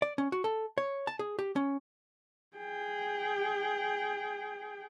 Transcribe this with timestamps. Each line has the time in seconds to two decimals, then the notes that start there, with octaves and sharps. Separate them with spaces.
0.02 D5
0.18 C#4
0.32 F#4
0.44 A4
0.78 C#5
1.07 A5
1.19 G#4
1.39 G4
1.56 C#4
2.57 G#4 G5